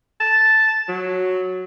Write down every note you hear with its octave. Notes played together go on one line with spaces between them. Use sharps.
A5
F#3